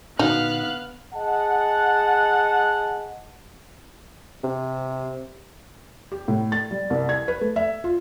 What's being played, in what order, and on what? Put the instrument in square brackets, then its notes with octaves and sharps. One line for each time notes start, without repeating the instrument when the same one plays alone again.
[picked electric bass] A#2 D3 [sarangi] B3 [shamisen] D#4 F#4 [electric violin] F5 F#6
[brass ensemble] G#4 D#5 F#5 A5
[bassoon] C3
[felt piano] G4
A2
A6
G3
C2
G#6
B4
A3
E5
F4